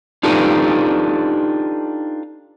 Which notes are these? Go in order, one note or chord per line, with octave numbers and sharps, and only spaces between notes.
D4 D#4 F4 G4 A4 B4